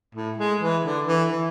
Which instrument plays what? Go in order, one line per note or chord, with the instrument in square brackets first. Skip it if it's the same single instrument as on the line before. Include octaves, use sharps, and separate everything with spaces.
[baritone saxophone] A2
G#3
E3
D3
E3
E3